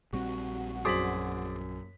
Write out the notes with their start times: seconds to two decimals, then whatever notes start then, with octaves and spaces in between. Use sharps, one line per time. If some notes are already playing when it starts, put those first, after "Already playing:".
0.13 A#1 G3 C4 F#4
0.85 F#2 G#4 C5 D5 B6 F#7